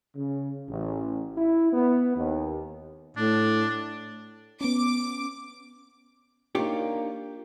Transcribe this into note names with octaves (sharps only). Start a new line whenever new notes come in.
C#3
A1
E4
B3
D#2
A2 D4
B3 C#4 D6
A#3 D4 D#4 F4 G4 C#5